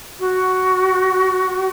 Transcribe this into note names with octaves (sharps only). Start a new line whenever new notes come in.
F#4